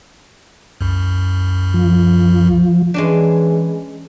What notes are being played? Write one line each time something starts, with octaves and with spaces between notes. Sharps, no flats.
C2 F#2
F3
E3 G#3 C#4 D4